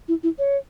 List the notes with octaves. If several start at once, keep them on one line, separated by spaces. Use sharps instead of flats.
E4
E4
C#5